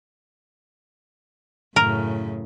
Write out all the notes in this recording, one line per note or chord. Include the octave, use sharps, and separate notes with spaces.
F#2 A2 C#3 A#4